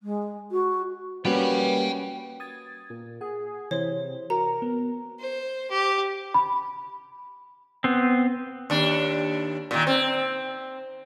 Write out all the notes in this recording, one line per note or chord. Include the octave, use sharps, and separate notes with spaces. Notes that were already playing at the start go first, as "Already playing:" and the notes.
G#3
F#4
G3 A#3 C#4 F#4 B4 G5 B5
D#6 G#6 A6
A#2
G#4 F#5
C3 E3 E4 C5 C#5
F#4 A#4 A#5
B3
C5
G4
B5
B3 C4
D#2 D4
A#2 D#3
C4